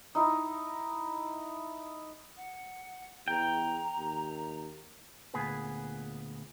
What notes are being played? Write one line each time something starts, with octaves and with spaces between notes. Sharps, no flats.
D#4 E4
F#5
E2 G5 A#5
D#2
D2 A#2 B3 G#4 B4